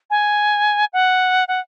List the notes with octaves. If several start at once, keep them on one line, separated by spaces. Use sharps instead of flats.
G#5
F#5
F#5